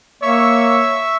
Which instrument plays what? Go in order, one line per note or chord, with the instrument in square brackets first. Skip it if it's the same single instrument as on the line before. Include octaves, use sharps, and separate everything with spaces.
[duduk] A#3 [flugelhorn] C#5 [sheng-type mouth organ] E5 C#6 E6